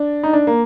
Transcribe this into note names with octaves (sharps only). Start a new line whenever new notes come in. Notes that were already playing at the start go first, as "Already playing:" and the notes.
Already playing: D4
D#4
D4
A#3